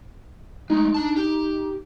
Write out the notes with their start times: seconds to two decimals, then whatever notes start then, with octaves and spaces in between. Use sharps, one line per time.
0.70 G#3 A3 D#4
0.94 D4 A5
1.16 G4